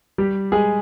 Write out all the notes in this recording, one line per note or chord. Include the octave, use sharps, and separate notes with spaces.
G3 G4
G#3 G#4